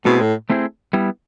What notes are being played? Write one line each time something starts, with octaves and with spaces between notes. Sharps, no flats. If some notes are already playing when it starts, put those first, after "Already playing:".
B2 A3 C4 E4 G#4 C5
A2
A3 C4 E4 G#4 C5
G3 B3 E4